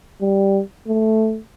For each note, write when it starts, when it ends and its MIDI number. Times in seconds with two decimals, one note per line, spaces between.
0.21 0.61 55
0.87 1.39 57